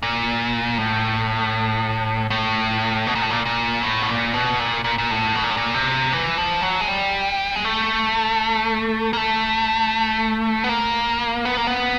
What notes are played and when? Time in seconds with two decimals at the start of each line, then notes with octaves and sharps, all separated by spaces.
0.03 A#2
0.78 A2
2.30 A2
3.07 B2
3.15 A#2
3.22 A2
3.30 A#2
3.45 A#2
3.83 A2
4.02 B2
4.09 A#2
4.34 B2
4.59 A#2
4.84 A#2
4.98 A#2
5.11 A2
5.35 B2
5.43 A#2
5.50 A2
5.57 A#2
5.74 C3
6.13 E3
6.38 F3
6.62 F#3
6.81 G#3
6.88 G3
7.56 G#3
7.65 A3
9.13 A#3
9.17 A3
10.64 B3
10.69 A#3
11.45 B3
11.57 A#3
11.67 B3